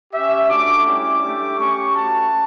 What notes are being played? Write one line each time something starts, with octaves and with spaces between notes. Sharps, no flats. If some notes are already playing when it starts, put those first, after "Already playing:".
C#4 G4 E5
A3 D4 F#4 D6
G3 C#4 E4 G4 D6
A3 D4 G4
C#4 G4 C#6
A3 C#4 F#4 A5